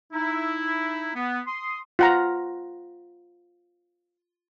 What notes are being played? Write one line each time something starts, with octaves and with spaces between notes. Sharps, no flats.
D#4 E4
B3
C6 D#6
F4 F#5 A#5